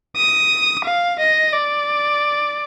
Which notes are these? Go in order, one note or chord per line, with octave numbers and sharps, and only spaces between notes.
D#6
F5
D#5
D5